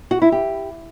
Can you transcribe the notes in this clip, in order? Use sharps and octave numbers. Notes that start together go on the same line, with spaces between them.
F#4
E4
G4